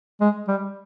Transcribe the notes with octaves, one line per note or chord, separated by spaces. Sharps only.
G#3
G3